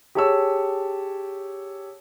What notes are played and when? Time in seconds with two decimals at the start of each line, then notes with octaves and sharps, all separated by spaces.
0.15 G4 G#4 C#5 A5 C#6 E6